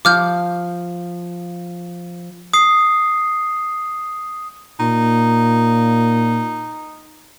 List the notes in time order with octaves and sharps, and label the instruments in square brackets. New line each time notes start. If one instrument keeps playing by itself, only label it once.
[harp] F3 [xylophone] D6 F6 G6
[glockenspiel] D#6 C7
[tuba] A#2 [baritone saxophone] D#4